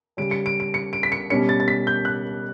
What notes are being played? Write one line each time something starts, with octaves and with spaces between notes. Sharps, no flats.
C#3 G3 C#4 D7
C#7
D7
D7
C#7
D7
B6
C#7
B2 G3 C#4 C#7
A6
A6
B6
G6
F#6